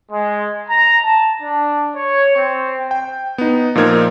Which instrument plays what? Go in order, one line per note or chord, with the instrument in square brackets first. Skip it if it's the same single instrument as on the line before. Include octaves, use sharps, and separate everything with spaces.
[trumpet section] G#3
A#5
A5
D4
C#5
C4
[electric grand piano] G5
B3 D#4
A#2 F3 D#4 A#4 G#6